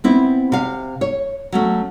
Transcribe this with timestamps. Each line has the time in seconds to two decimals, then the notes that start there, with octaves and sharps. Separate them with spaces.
0.04 B3 C4 E4
0.52 C3 F5
1.01 C#5
1.52 F#3 A3 C#4